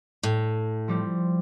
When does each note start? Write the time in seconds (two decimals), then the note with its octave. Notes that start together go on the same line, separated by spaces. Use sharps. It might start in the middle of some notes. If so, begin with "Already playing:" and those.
0.23 A2
0.88 F3 G3 C4